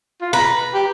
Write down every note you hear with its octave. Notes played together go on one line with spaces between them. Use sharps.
F4
B4 A#5
G4